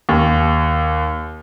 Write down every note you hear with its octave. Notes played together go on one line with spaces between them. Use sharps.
D#2